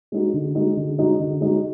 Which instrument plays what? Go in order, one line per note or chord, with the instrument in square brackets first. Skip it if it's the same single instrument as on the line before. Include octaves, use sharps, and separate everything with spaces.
[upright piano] G#3 D#4 F#4
D3
G#3 D#4 F#4
D3
G#3 D#4 F#4
D3
G#3 D#4 F#4